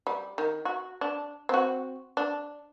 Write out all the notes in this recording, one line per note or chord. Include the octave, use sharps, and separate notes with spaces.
G3
D#3
F#4
D4
C4 F#4
D4